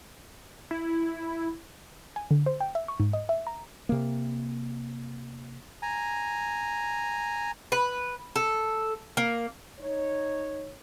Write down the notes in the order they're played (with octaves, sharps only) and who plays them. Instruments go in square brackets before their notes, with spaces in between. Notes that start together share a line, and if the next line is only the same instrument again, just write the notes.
[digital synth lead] E4
[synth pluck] G#5
D3
C5
G5
E5
C#6
G#2
D#5
E5
A#5
[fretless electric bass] C3 A#3
[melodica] G#5 A#5
[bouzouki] B4
A4
A#3
[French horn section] D#4 C#5